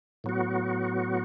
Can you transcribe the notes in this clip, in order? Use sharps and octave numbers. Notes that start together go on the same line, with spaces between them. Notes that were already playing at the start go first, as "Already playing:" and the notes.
A2 F#3 B3 F#4